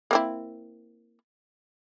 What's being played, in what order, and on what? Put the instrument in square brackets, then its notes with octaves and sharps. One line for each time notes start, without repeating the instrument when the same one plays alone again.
[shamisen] A#3 C4 E4